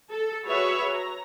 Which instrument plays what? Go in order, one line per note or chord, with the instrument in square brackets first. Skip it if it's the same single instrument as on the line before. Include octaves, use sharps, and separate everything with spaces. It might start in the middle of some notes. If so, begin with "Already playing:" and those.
[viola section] A4
F#4 G#4 B4 C#5 E5
A#5